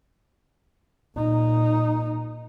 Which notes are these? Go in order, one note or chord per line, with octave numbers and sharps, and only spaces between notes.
A#2 D#4